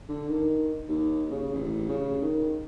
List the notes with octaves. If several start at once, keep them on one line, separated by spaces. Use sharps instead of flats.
D3
D#3
D#2
C#3
A1
C#3
D#3